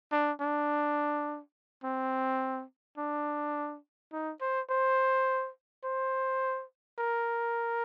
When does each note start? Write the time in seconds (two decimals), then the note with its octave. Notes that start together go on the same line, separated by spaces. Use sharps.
0.12 D4
0.40 D4
1.84 C4
2.98 D4
4.12 D#4
4.41 C5
4.70 C5
5.84 C5
6.99 A#4